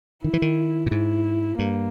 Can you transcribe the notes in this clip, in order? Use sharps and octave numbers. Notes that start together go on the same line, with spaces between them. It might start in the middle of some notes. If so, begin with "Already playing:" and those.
D#3 E4
E3
D#3
A#2
G#2 E4
G2 A#3